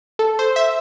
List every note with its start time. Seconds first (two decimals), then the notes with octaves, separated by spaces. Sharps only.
0.19 A4
0.39 C5
0.56 E5